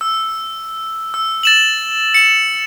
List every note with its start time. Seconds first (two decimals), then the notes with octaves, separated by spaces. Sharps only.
0.01 E6
1.14 E6
1.43 A6 E7 F#7
2.14 C#7 E7